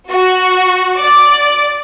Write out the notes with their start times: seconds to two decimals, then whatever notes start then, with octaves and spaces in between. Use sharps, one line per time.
0.11 F#4
0.99 D5